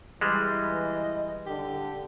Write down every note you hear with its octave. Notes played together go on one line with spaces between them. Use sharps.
E3 G3 G#3 D#5
D3 G4